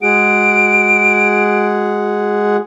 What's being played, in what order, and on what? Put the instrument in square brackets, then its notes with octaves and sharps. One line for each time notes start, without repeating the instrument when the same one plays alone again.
[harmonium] G#3 G#4 F#5 [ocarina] F#4 [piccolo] D7